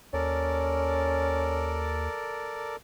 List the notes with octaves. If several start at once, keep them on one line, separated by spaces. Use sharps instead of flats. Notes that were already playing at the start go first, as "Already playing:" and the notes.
D#2 C#4 A4 A#4 D5